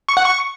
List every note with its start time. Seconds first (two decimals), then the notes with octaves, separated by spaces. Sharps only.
0.09 C#6
0.17 F#5
0.25 C#6